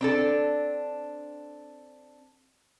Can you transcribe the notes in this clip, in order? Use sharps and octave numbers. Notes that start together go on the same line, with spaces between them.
C4 D4 A4